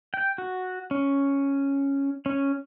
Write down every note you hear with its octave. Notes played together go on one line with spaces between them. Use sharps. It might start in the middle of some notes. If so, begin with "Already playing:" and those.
G5
F#4
C#4
C#4